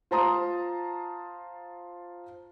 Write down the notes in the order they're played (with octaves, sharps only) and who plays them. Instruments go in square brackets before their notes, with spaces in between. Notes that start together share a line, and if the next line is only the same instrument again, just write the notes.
[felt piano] F4 C5 A5 A#5 C6 D#6